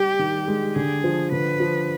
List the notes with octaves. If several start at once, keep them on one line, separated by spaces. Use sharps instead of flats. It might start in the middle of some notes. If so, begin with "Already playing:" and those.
Already playing: G3 G4
D#3
G#3
D3 G#4
F3
D3 B4
F3